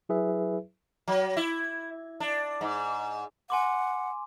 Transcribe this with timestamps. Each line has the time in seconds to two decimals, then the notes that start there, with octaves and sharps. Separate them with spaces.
0.09 F#3 E4 G#4 B4 E5
1.08 F#3
1.36 E4
2.20 D4
2.61 G#2
3.50 F#5 G#5 C6 D6